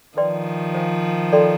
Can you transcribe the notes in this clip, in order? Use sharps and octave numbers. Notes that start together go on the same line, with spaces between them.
D#3 F3 B4 D5 G5 C6
C5 F5 G#5
A4 D5 G5 C6